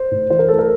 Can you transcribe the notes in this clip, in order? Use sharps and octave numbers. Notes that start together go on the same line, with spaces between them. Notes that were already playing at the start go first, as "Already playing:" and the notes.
Already playing: C5
A2
E3 C5
A#4
A3 A4
A#4